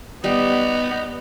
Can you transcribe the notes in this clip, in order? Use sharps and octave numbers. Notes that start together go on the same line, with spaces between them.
G3 B3 D#4